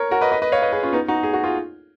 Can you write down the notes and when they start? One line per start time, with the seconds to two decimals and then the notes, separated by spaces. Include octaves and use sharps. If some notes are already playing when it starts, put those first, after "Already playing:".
Already playing: A#4 C#5
0.11 F#4 A#4
0.21 B4 D#5
0.32 B4 D#5
0.42 B4 D#5
0.52 C#5 F5
0.62 B4 D#5
0.72 G#4 B4
0.83 C#4 F4
0.93 B3 D#4
1.08 D#4 F#4
1.23 G#4
1.33 F#4
1.44 F4 G#4